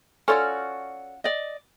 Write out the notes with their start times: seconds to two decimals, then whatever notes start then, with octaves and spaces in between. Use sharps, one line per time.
0.28 C#4 F4 F#4 A4 C#5 D5
1.24 D5 D#5